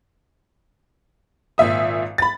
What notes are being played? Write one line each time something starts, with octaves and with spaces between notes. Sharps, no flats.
G#1 A#2 E5 D#6
B5 A6